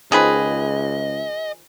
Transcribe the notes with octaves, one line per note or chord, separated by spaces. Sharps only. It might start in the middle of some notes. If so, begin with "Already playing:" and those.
C#2 D#3 F3 G#4 B4 D#5